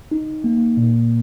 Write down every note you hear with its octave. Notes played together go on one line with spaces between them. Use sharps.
D#4
A#3
A#2